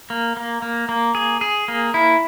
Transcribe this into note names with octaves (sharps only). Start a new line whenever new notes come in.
A#3
A#3
A#3
A#3
G#4
G#4
A#3
E4